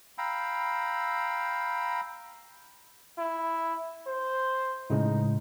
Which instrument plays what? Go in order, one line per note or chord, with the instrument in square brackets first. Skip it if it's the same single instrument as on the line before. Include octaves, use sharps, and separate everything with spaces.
[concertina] F5 G5 A#5 B5 E6
[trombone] E4
C5
[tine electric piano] A2 C#3 G#3 [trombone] D#4